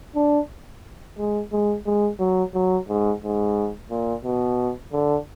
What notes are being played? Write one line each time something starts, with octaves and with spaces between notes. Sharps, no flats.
D4
G#3
G#3
G#3
F#3
F#3
G#2
G#2
A#2
B2
D3